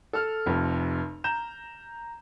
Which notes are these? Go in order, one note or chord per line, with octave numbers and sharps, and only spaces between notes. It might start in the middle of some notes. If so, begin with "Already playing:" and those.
A4 F6
F1 F2
A#5 G6 E7